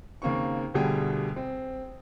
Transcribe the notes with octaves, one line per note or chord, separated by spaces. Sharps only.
D#2 C#3 A#3 C4 C#6
D2 B2 D3 G3 G#4 G5
C4